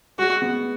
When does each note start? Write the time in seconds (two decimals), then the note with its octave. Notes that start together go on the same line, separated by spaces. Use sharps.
0.19 G#3 F#4
0.42 B3